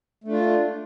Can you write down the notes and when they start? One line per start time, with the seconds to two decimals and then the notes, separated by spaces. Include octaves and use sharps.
0.24 A3
0.28 D4
0.32 F4